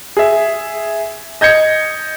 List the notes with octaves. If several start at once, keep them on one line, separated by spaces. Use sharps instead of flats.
G#4 E5
D#5 G6 G#6 C#7